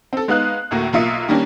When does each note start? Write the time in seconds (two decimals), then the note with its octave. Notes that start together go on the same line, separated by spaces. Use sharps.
0.13 C4 A4
0.28 G#3 B3 D#4 F5 F#6
0.71 D2 A2 A#3 F#4
0.93 B1 A#3 F4 E5 D#6 C#7
1.28 D#3 G3 A#3 C#4 D4